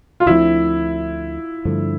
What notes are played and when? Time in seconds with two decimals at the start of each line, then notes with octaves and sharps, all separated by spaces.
0.20 F4
0.26 D2 D3 F3 C4 E4
1.65 G2 D3 F3 A3